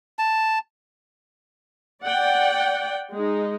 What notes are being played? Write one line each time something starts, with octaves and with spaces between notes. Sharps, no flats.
A5
D5 F#5 G5
G#3 D#4